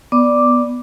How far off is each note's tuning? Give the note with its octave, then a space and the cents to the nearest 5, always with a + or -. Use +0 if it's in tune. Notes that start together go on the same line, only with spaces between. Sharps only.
B3 -5 D5 +0 D6 +0